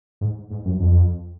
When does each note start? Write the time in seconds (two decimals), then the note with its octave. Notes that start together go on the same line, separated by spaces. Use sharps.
0.21 G#2
0.50 G#2
0.65 F#2
0.80 F2